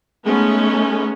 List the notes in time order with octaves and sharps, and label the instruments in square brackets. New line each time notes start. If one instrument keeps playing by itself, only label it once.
[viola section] G#3 A3 B3 C#4 D#4